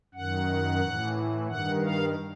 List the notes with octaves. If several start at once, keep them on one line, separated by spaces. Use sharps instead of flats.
F#2 D#3 F#5
A2 E3
G2 D#3 F#5
F5